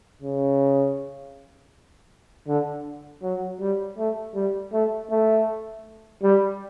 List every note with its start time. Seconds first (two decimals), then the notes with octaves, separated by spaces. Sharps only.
0.22 C#3
2.47 D3
3.22 F#3
3.60 G3
3.97 A3
4.35 G3
4.72 A3
5.10 A3
6.23 G3